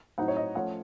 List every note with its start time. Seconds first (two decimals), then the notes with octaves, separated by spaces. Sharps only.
0.18 A2 F#3 C4 D#4 F#5
0.28 C#5
0.37 D#5
0.55 F3 A3 C#4 F#5